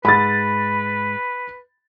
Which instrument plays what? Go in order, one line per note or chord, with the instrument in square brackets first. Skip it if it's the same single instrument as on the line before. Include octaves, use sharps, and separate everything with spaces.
[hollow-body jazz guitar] G#2 [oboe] B4 [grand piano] B5 A6